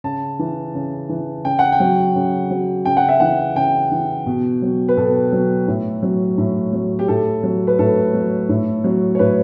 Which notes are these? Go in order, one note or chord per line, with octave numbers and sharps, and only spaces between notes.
C#3 A5
E3
C#3
E3
C#3 G5
F#5
G5
F#3
C#3
F#3
C#3 G5
F#5
E5
E3 F#5
C#3 G5
E3
B2
F#3
B4
B2 A4
F#3
A2
F#3
A2
F#3
G4
A2 A4
F#3
B4
A2 A4
F#3
A2
F#3
C#5
A2 B4